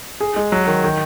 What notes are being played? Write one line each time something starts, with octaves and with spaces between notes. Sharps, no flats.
G#4
G#3
F#3
D#3
D#3